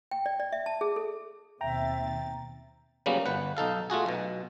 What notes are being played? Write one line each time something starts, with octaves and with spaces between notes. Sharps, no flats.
G5
D5
D5
E5
A5
G#4
A4
D#2 B2 C4 E5 G5 A#5 A6
C#3 F#3 G3 A#3 B3 C#4
G1 B4 F#5
B1 D#4 A4 F5
A3 F4 F#4 G#4
B1 B2